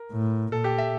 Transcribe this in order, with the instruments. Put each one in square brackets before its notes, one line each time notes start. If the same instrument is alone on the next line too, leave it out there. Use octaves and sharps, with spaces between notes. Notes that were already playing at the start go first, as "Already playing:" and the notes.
Already playing: [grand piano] A#4
[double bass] A2
[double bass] A#2 [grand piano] A4
[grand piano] G4
E5